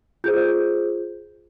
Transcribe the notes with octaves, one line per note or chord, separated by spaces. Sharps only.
F4 G#4 C5 G6